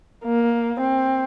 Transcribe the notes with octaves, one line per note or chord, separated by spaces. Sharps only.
A#3
C4